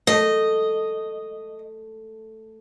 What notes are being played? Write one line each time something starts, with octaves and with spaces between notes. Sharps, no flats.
A3 D#5